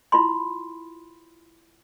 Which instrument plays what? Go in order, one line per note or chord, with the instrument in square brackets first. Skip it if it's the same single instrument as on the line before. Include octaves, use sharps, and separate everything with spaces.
[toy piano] E4 F4 B5 C6